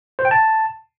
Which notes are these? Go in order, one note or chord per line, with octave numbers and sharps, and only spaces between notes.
C5
G5
A5